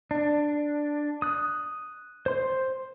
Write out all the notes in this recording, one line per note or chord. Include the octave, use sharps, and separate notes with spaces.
D4
D#6 F#6
C5 C6